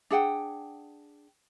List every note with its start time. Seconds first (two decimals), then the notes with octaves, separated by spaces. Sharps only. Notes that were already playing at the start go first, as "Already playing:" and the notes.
0.10 D4 G#4 F#5 G5